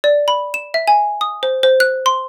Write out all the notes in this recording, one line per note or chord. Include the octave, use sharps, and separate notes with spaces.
D5
B5
E7
E5
G#5
D#6
C5
C5
F#6
C6